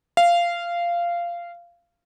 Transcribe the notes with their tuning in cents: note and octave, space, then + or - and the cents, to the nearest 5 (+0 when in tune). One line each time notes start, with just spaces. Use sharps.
F5 -15